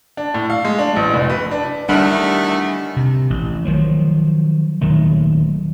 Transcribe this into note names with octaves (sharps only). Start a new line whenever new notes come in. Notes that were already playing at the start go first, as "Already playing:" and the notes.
D4
A2
F5
G#3
D4
A1
F1
B4
D4
E2 D#3 G3 A3 D4 F#5 B5 F6
C3
A1
D#3 F3 F#3
D#1 D#3 F#3 A3